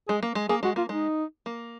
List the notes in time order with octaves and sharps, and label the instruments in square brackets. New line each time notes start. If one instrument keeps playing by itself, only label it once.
[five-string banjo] G#3 [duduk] G#4
[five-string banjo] A#3
G#3
[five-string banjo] A#3 [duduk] G#4
[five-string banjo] G#3 [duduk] F#4
[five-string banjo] A#3 [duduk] F4
[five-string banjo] G#3 [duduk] D#4
[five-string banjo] A#3